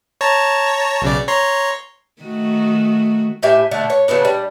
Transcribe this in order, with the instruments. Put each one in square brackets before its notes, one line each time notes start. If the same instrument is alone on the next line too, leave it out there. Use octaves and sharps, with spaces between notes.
[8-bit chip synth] C#5 A5 A#5
B1 C#3 D5
C#5 A#5 C6
[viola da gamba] D#3 A3 F#4
[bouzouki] A2 G4 E5 G#5
B2 D3 A3
C#5
C#3 F#3 B3 D4
G3